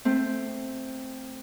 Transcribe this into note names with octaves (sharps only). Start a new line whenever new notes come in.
A3 C4